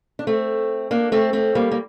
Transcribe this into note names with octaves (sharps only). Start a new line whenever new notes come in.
D4
A3 C4
A#3 D4
A3 C4
A3 C4
G3 A#3
A#3